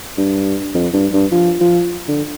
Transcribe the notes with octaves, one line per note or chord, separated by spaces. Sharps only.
G2
F2
G2
G2
F3
F3
D3